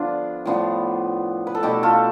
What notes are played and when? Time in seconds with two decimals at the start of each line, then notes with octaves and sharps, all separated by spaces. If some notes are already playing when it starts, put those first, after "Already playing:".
Already playing: D3 F3 B3 D4 F4
0.45 A2 F3 B3 D4
1.47 B4
1.55 A4
1.63 B2 A3 D4 E4 G4
1.83 F4 A4